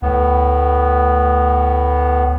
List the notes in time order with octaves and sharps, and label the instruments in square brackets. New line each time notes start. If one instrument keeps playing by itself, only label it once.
[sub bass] D2 [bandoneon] A2 B3